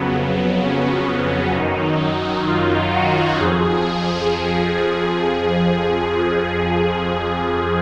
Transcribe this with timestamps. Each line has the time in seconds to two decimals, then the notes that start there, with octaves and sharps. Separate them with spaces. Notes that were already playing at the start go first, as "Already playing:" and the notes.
Already playing: F2 C#3 F#3 B3
0.17 B3
0.64 C#4
1.55 F#2 D#3 F#3 D#4
2.47 F4
2.94 F#4
3.40 F2 F3 G#4